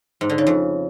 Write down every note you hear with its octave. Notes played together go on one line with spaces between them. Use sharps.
G#2
D3
C#3
F2